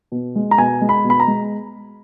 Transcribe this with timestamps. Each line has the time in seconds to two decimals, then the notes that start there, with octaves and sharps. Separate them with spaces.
0.12 B2
0.36 G#3
0.51 A#5
0.58 B2 G#5
0.81 G#3
0.89 B5
1.04 B2
1.10 B5
1.20 A#5
1.28 G#3